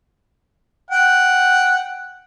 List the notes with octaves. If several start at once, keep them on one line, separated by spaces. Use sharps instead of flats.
F#5 G5